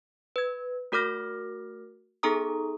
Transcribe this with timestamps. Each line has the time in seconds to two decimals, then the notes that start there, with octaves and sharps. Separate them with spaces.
0.36 B4 G#6
0.92 A3 F#4 A#4 D6 F6 A#6
2.23 B3 D#4 G#4 A4 A#5 D#6